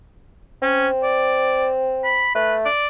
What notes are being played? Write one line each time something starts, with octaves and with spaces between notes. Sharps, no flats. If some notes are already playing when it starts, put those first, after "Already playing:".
C4 C#4
D5
B5
A3 B4
D5